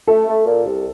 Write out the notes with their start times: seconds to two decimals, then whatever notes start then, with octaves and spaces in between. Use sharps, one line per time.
0.07 A3 A4
0.26 A3
0.46 A#2
0.64 C2